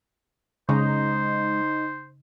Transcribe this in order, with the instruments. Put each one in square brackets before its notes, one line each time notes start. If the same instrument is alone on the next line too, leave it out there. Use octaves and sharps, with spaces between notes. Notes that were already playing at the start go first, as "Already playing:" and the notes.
[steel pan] C#3 [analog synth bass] G#3 [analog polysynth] D#4 [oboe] C5